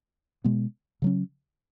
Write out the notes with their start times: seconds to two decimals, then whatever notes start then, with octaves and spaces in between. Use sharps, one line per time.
0.44 B2 G#3 B3
1.02 C#3 F#3 C#4